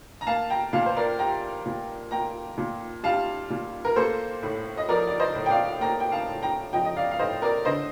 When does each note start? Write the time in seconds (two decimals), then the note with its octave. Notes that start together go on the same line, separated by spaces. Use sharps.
0.21 A#5
0.27 A#3 F5 A5
0.50 G5 A#5
0.73 A#2 F5 A5
0.86 C5
0.97 A#4 D5
1.19 G3 G5 A#5
1.65 A#2
2.11 A#3 G5 A#5
2.58 A#2
3.03 G3 F5 A5
3.50 A#2
3.85 A#4
3.96 A#3 A4 C5
4.43 A2
4.78 D#5
4.89 F3 A#4 D5
5.07 D5
5.20 C5 D#5
5.35 A2
5.46 G5
5.50 D5 F5
5.81 A#3 G5 A#5
6.00 G5
6.12 F5 A5
6.28 A2
6.42 G5 A#5
6.73 F3 D#5 G5
6.85 D#5
6.97 D5 F5
7.11 F5
7.19 A2 C5 D#5
7.42 A#4 D5
7.65 D3 C5 D#5